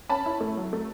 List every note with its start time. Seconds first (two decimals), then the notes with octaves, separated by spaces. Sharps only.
0.09 C#4 A5 B5
0.26 E4
0.41 A3
0.57 F#3
0.73 A3